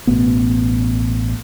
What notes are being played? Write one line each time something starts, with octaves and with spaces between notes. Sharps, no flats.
A1 B2 A3 B3